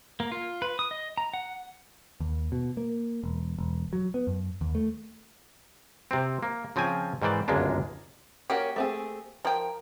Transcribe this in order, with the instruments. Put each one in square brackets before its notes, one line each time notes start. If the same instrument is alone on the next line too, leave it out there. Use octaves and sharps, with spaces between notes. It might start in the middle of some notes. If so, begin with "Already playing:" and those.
[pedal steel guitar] A#3
F4
B4
D#6
D#5
A#5
F#5
[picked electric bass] D#2
B2
A#3
E1
E1
F#3
B3
F#2
D#2
A3
[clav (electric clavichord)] C3 C4
A#3
C#3 F3 C4 F4 G#5
G#2 D#3 E3 C5 D5
G1 C#2 F#2 G#3 A#3 D4
[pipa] A#3 G4 [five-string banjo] C#4 F#4
[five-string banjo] A3 C4 G#4
[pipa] F3 G5 [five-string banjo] A#4